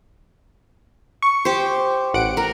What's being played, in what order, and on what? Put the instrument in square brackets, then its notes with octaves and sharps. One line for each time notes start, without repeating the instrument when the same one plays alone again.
[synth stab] C#6
[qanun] G4 C5
[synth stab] A1 F#5 D7
[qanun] A#4